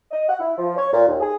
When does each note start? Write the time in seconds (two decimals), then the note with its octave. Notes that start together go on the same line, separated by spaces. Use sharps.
0.12 D#5
0.28 F#5
0.40 E4
0.58 F3
0.76 C#5
0.93 A#2
1.07 D#2
1.20 G#4